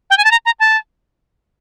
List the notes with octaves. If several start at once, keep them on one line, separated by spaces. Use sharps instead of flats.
G5
G#5
A5
A#5
A#5
A5